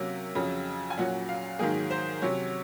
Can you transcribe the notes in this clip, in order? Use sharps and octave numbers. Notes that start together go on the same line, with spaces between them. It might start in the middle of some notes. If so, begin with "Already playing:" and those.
Already playing: C3 F#3 A#3 C#4
F2 C#3 F#3
G#5
A#2 F#3 C#4 F#5
F5
G#2 D#3 F#3 A#3 G#4
C5
C3 F#3 C#4 C#5